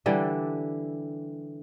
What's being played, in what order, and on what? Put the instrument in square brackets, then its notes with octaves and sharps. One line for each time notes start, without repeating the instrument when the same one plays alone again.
[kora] D3 E3 G3 D4